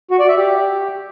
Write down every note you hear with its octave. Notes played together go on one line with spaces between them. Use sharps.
F#4
D5
E5
G4